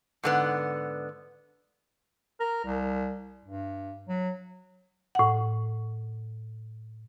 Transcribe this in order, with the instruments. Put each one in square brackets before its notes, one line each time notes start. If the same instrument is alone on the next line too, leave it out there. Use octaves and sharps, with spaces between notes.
[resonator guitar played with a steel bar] G#2 D3 B3
[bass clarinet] A#4
C2
G2
F#3
[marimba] A2 F#5